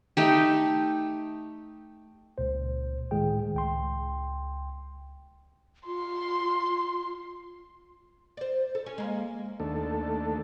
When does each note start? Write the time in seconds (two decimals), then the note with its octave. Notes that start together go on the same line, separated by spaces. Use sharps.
0.17 A3 D#4 G4
2.38 C#2 A#2 C5
3.11 A2 D#3 G#3 G#4 G5
3.54 C#2 G5 C6
5.86 F4 C6
8.37 C5 D5
8.75 A4
8.86 C#4
8.98 G#3 A#3
9.60 D#2 A3 D4 A4